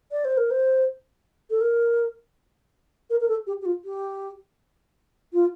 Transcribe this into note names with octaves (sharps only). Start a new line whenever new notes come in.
D5
C5
A#4
C5
A4
A#4
A#4
A#4
A4
G4
G4
F4
G4
F4